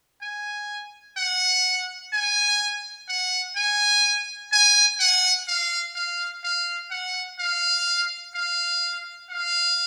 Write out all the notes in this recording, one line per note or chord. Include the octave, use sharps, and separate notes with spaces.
G#5
F#5
G#5
F#5
G#5
G#5
F#5
F5
F5
F5
F#5
F5
F5
F5